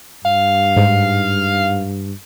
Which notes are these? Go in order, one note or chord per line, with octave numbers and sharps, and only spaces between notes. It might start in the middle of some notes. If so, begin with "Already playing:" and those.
G2 F5
G#2